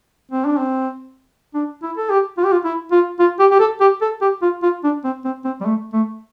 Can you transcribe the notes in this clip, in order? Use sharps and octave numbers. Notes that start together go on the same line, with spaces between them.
C4
D4
C4
D4
E4
A4
G4
F4
G4
F4
E4
F4
F4
G4
G4
A4
G4
A4
G4
F4
F4
D4
C4
C4
C4
G3
A3
A3